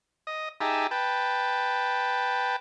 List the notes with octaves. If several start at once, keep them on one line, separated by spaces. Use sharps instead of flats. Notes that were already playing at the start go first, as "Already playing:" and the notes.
D#5
D#4 G4 G#4 E5 A5
B4 G5 A5